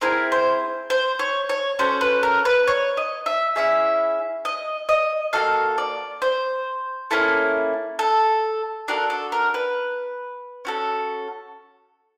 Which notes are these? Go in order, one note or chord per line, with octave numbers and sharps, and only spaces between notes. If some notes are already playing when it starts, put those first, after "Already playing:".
C4 E4 G#4 A#4
C5
C5
C#5
C#5
C#4 F#4 A4 C5
B4
A#4
B4
C#5
D#5
E5
C#4 E4 G#4 E5
D#5
D#5
A#3 D4 F#4 A4 F5
D5
C5
A#3 C#4 E4 A4
A4
D4 F#4 A4 A#4
A4
A#4
B4
C#4 F#4 A4